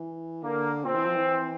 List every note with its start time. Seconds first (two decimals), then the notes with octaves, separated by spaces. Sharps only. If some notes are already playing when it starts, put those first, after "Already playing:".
Already playing: E3
0.42 D3 A#3
0.85 A#2 C4
0.95 E3
1.06 F3
1.16 E3